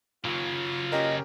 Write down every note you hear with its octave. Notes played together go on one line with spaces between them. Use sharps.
D#2 C#3 F#3 F4
C#4 G4 A#4 D#5